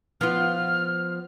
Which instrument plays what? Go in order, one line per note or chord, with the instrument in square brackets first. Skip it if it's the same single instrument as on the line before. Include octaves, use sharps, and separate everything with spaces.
[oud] F3 B3 F4 [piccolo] F6